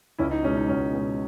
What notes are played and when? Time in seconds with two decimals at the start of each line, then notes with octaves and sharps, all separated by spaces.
0.18 C#2 C#4 E4
0.31 D#4
0.43 B2 G#3 C#4
0.57 D#4
0.69 C#2 C#4
0.94 B2 G#3